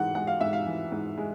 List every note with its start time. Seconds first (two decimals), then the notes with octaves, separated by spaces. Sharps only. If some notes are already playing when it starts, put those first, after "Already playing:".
Already playing: G#2 E3 F#5
0.15 G#3 F#5
0.27 F5
0.41 G#2 E5
0.53 F5
0.66 E3
0.92 G#2
1.18 G#3